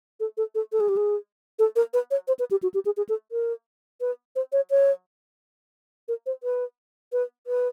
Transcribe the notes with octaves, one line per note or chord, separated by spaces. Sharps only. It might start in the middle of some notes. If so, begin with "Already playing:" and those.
A4
A4
A4
A4
G#4
G4
G#4
A4
A#4
B4
C#5
C5
B4
G4
F#4
G4
G#4
G#4
A4
A#4
B4
C5
C#5
C#5
A#4
C5
B4
B4
B4